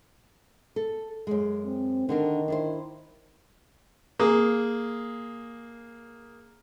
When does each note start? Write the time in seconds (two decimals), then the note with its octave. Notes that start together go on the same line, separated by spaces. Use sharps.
0.76 A4
1.27 F#2 G#3
1.65 C4
2.09 D3 D#3 D4 A#4
2.48 D4 E4 C5
4.19 A#3 G#4